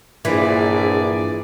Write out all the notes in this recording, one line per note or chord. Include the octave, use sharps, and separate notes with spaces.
A#1 G2 E3 G#4 D5